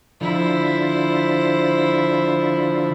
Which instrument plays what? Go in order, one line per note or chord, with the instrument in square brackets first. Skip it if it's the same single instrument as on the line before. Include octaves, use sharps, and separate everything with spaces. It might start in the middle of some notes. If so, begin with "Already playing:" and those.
[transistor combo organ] D3 F3 [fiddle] E4 C5